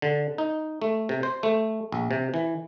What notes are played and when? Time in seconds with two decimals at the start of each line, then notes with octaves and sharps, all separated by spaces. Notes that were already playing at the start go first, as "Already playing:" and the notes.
0.02 D3
0.38 D#4
0.82 A3
1.09 C3
1.23 C5
1.43 A3
1.92 A#1
2.11 C3
2.34 E3